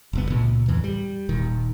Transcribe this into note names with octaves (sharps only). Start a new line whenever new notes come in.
F1 C2 B3
C#2 A#2
E2 A2 E3
G3
D#1 D#3